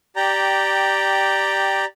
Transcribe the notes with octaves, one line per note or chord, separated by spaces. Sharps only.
G4 D5 G5 A#5